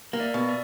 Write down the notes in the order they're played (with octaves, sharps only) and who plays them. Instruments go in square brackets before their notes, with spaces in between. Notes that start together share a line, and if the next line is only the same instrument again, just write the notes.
[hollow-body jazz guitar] A#3 [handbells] F5
[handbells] D5 E5
[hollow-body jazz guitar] B2
[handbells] D5 E5